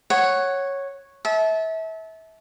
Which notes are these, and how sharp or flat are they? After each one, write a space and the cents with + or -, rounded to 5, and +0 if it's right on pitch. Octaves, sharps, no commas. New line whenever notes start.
C#5 -5 F#5 +10
E5 -30 A5 -25